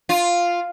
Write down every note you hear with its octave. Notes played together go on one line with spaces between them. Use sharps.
F4